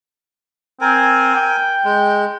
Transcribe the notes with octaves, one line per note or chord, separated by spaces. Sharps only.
C4 A#4 G#5
G5
G#3